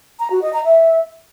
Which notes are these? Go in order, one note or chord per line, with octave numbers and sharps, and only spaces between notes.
A#5
F#4
D#5
A#5
E5